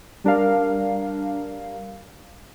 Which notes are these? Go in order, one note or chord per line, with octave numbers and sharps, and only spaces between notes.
G3 D4 A#4 F5